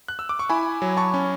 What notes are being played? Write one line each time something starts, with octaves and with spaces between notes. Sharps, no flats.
F#6
E6
D6
C#6
E4 G#5 B5
F#3
A5 C#6
C#4